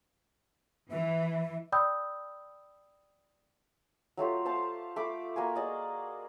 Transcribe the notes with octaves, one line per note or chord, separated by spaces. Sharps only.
E3 E5
D5 G5 B5 D#6 E6 G6
F#3 A3 F4 G4
C5 F5 A5
A3 B5 D6
A#3 F#4 G#5
G#4 D5 D#5